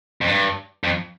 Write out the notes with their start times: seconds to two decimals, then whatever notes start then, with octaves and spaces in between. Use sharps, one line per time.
0.21 F2
0.28 G2
0.84 F2